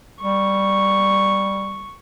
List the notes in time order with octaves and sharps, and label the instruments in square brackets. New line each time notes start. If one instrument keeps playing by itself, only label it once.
[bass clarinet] G3 [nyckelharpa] C#6